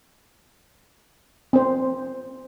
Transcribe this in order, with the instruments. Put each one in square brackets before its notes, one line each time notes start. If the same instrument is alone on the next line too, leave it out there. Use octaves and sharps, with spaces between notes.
[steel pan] C4 C5